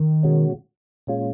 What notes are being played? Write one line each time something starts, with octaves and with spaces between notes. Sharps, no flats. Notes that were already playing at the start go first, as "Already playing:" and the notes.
Already playing: D#3
B2 G#3 C#4 F#4
A#2 G#3 C#4 F4